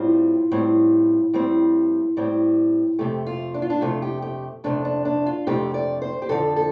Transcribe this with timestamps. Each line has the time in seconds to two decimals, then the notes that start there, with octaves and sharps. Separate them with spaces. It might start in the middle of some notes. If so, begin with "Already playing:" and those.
Already playing: A2 G3 C4 F4
0.51 A2 G3 C4
1.33 A2 G3 C4
2.17 A2 G3 C4
2.99 F2 C3 A3 G4
3.26 F4
3.54 D4
3.62 F4
3.70 D4
3.81 F2 C3 A3 F4
4.02 G4
4.22 G4
4.64 F2 C3 A3 D4
4.85 D4
5.05 D4
5.26 F4
5.47 F2 C3 A3 G4
5.74 D5
6.02 C5
6.22 G4
6.29 F2 D3 F3 A4
6.56 A4